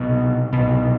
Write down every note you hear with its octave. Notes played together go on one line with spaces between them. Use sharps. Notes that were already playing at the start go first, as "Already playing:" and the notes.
Already playing: C2 B2
C2 B2